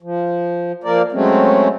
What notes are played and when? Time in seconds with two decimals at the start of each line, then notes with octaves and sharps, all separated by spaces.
0.02 F3
0.84 F3 A#3 A#4 D5
1.12 F#3 G#3 A3 C4 C#4